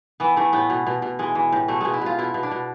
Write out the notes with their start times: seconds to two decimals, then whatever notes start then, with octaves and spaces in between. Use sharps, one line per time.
0.20 E3 B3
0.37 E3 A3
0.53 A2 B3
0.70 B2
0.87 B2
1.02 B2
1.19 E3 G#3
1.35 E3
1.52 A2
1.68 B2 A3
1.81 B2 G#3
1.93 E4
2.01 B2 F4
2.19 B2 E4
2.34 B2
2.43 D4
2.51 B2